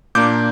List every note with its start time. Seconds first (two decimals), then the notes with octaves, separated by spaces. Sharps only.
0.15 A#2 A#3 D4 D6 G6